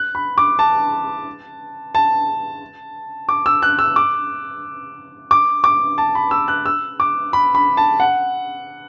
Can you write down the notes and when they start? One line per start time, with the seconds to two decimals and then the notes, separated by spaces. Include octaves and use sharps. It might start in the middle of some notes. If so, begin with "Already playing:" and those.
Already playing: F#6
0.15 B5
0.38 D6
0.59 A5
1.95 A5
3.29 D6
3.46 E6
3.62 F#6
3.79 E6
3.96 D6
5.31 D6
5.64 D6
5.98 A5
6.15 B5
6.31 E6
6.48 F#6
6.66 E6
7.00 D6
7.33 B5
7.55 B5
7.77 A5
8.00 F#5